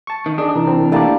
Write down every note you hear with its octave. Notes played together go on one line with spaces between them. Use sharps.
A5 C#6
D#3
D4 G#4 D#5
C3 E3 D#4 A#4
C4
G3 A3 A#3 D5 A5